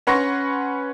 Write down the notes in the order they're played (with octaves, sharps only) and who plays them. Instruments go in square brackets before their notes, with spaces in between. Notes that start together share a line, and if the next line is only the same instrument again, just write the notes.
[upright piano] C#4 B4 F#5 C6 C#6 A#6